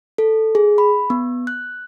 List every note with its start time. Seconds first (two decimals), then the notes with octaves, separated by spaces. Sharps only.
0.18 A4
0.55 G#4
0.78 B5
1.10 B3
1.47 F#6